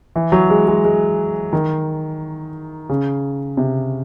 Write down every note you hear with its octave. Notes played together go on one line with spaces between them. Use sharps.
E3
F#3
G#3
G#3
G#3
D#3
C#3
C3